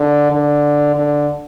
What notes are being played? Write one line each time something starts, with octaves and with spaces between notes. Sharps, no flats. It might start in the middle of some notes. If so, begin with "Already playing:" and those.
Already playing: D3
D3
D3